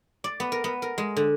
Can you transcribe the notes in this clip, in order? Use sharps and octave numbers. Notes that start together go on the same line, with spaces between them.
D5
B3
A#4
B3
A#4
G#3
D3